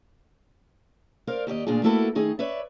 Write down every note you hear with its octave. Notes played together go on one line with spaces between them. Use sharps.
A#4 C5 D5 F5
D#2 G4 D5 D#5
D2 A#2 D4 F4 G#4
A3 A#3 E4 F#4 A4 B4
D#3 A3 D#4 G#4
B4 C#5 D5 E5